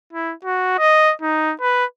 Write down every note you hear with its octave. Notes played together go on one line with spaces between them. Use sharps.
E4
F#4
D#5
D#4
B4